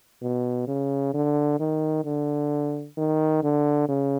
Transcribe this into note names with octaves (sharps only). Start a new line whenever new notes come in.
B2
C#3
D3
D#3
D3
D#3
D3
C#3